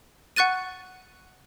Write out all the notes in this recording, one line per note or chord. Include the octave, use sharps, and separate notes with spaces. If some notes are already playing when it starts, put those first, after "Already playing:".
F#5 C#6 F#6 A6 D#7